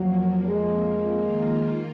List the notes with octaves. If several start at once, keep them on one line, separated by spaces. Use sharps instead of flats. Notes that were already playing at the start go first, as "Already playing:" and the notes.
Already playing: F2 F3 F#3 A#3
G#3
D#3 A#3 F4